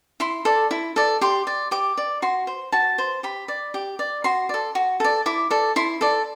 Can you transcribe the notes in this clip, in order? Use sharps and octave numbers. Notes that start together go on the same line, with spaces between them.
E4 C6
A4 D5
E4
A4 D5
G4 C6
D5
G4 D6
D5
F#4 C6
C5
F#4 A5
C5
G4 B5
D5
G4
D5
F#4 C6
A4 D5
F#4
A4 D5
E4 D6
A4 D5
E4 C6
A4 D5